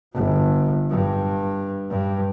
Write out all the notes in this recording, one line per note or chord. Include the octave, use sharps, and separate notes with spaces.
G1
G2
G2